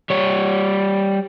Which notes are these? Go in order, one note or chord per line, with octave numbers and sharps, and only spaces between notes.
G3 C#5